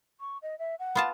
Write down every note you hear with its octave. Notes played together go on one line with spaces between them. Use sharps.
C#6
D#5
E5
F#5
B3 F4 A5